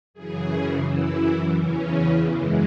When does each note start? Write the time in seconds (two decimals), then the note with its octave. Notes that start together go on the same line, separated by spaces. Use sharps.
0.14 F#2 C#3 E3 G#4
0.84 F#2 E3 E4
1.56 E2 C#3 E3 C#4
2.28 F#2 E3 G#3